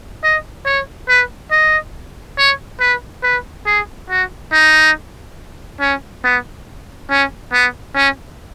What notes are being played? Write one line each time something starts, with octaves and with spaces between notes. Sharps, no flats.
D#5
C#5
B4
D#5
C#5
B4
B4
G#4
F#4
D#4
C#4
B3
C#4
B3
C#4